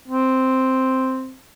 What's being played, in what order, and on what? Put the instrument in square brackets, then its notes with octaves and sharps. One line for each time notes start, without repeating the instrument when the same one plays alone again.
[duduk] C4